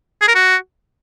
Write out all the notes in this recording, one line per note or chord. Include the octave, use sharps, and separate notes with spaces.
G#4
A#4
F#4